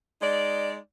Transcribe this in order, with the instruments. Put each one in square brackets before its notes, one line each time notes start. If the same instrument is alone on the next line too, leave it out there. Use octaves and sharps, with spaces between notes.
[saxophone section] G#3 D#4 D5